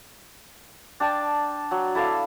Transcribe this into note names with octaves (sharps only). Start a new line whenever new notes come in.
D4 G5 A5
F#3
E4 A4 D5 F5